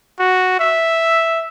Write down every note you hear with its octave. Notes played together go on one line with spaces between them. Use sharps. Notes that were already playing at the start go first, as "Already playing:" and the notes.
F#4
E5